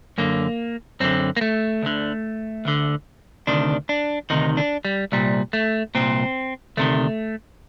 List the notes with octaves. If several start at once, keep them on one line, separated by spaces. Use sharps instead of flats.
F#2 D3 A#3
F#2 D3 C4
A#3
A3
D2 D3
D2 D3
D2 C3 D#3 D4
D4
D2 C3 D#3 D#4
D4
G3
C2 A#2 G3
A3
C2 A#2 C4
D2 C3 D#3 A3